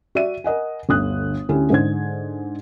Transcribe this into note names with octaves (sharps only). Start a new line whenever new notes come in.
F#4 D5 E5 D#7
A#4 D#5 F#5 G#5
G1 D2 D#6 F#6
D2 C#4 E4 G4
G#2 D3 C5 G#6